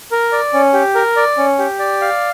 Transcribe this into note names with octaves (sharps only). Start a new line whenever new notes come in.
A#4
D5
C#4
G4
A#4
D5
C#4
G4
D5
F5